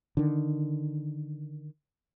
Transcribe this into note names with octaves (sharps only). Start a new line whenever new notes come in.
D3 D#3